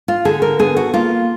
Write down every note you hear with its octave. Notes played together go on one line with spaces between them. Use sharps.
F4
D3 G#4
A#4
B3 G#4
F#4
A#3 F4